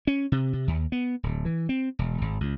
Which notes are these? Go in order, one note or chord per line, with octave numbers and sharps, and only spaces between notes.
C#4
C3
C3
D#2
B3
D1
E3
C4
E1
G#1
C#2